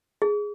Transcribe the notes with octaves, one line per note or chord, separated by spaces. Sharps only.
G#4